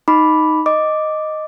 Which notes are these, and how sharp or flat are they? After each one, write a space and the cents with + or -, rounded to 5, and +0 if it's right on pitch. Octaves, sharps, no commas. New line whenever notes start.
D#4 +0 B5 +0 D6 -5
D#5 +0 D6 +0